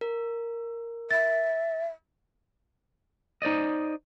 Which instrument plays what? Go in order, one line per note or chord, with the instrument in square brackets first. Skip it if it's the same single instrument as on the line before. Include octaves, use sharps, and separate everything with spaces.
[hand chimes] A#4
[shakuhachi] E5 [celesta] A6
[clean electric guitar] D#4 C5 D5 D#5